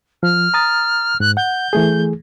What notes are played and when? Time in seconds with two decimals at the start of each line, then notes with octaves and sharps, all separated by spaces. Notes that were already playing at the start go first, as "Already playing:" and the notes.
0.23 F3 F6
0.54 A#5 D#6 A6
1.20 G#2 F#6
1.37 F#5 G6
1.73 E3 A3 G#4